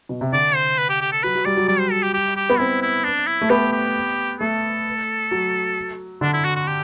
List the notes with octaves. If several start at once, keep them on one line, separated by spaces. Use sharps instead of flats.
B2
C3
D3 D5
C5
B4
G4
G4
A4
F#3 B4
F#3
G3 D5
F#3
G3 D5
C5
A4
G4
G4
G4
B3
C4 E4
E4
D4
E4
A3
B3 G4
G4
A3 A4
F#3
D3 D4
E4
F#4
F#4
G4